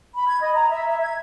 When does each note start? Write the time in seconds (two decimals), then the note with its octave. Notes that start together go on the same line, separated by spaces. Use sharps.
0.15 B5
0.28 G#6
0.41 D#5
0.55 A#5
0.69 E5
0.90 E5
1.02 G#6